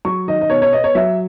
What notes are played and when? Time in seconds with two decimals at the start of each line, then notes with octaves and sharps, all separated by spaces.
0.05 F#3 C#6
0.28 D#3 D#5
0.41 D#5
0.50 B2 C#5
0.62 C#5
0.72 B3 D#5
0.84 C#5
0.95 F#3 E5